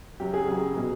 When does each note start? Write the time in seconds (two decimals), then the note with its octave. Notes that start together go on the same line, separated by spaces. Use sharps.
0.20 F#2 C#3 F#3 G4
0.34 G#4
0.48 F#2 C#3 F#3 G#4
0.76 B2 G3 B3